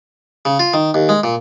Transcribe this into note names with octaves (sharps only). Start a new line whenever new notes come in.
C#3
F4
D#3
D#2
G#3
A#2